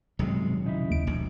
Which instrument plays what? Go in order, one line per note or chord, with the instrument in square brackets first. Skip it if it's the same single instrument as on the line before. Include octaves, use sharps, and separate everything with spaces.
[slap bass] D#1 B1 F#3 [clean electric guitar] G2 C3 G#3
[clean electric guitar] C#3 D#4 E4
[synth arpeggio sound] D#2 D7
[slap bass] E1 A#1